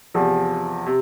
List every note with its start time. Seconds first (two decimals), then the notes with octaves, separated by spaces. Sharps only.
0.14 E2 C3 F3
0.86 C3